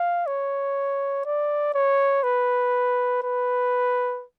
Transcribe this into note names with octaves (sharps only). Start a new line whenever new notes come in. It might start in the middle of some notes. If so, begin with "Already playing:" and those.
Already playing: F5
C#5
D5
C#5
B4
B4